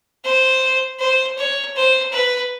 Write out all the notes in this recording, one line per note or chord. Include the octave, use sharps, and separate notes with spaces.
C5
C5
C#5
C5
B4